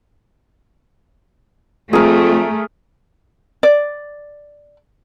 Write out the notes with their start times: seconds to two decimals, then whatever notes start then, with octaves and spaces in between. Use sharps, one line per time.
1.93 F2 A3 G#4 A#4
3.63 D5